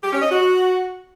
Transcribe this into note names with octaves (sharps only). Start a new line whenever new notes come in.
G4
C#4
D#5
F#4